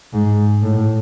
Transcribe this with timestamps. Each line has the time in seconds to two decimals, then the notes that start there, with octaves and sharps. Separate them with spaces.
0.13 G#2
0.62 A2